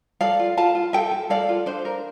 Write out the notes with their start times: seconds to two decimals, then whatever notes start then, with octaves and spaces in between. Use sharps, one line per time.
0.21 A4 D5 F5
0.39 F4
0.57 F4 F5 A5
0.75 F4
0.93 A4 E5 G5
1.12 A4
1.30 A4 D5 F5
1.49 F4
1.66 D4 C5
1.85 A#4